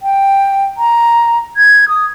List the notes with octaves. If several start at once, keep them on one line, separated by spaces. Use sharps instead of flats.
G5
A#5
G#6
D#6